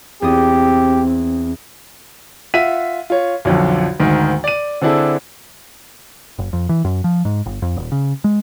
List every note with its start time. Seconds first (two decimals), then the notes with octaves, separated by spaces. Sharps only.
0.22 E2 C4 F4 G4 D#6
2.54 F4 E5 F#5 B6 D#7
3.10 F4 C#5
3.45 B1 F2 D3
4.00 D2 G#2 D#3
4.44 D5 D#7
4.82 D3 C4 D4 E4 G#4 A4
6.39 F#1
6.53 F2
6.69 E3
6.85 F#2
7.04 F3
7.25 G#2
7.46 G1
7.62 F2
7.76 D#1
7.92 C#3
8.24 G#3